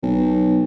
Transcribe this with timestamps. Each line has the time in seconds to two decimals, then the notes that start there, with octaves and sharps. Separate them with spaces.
0.03 B1